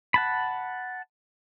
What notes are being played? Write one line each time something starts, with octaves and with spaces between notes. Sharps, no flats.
F#5 A5 B5